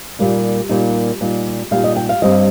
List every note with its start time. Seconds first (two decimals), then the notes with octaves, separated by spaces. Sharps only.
0.19 A#2 G3 A#3 D#4
0.69 A#2 G3 A#3 D#4
1.21 A#2 G3 D#4
1.71 A#2 G3 D#4 F5
1.84 D#5
1.97 G5
2.09 F5
2.22 G2 G3 C4 F4 D#5